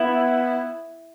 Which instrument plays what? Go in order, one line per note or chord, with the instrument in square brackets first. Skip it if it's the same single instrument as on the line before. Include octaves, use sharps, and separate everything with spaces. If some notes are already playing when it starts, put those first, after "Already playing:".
Already playing: [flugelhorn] B3 [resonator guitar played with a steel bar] E4